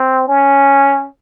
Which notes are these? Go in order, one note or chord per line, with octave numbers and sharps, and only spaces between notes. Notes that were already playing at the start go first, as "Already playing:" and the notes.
Already playing: C4
C#4